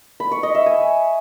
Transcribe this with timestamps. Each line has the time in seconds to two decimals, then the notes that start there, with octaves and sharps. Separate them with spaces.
0.20 B5
0.32 C#6
0.43 D#5
0.55 E5
0.66 G#5